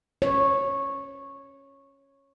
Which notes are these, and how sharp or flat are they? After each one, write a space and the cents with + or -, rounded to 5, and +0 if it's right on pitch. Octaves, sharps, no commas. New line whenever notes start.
C#5 -10